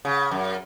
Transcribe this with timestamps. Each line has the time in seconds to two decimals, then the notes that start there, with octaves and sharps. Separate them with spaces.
0.05 C#3
0.31 F#2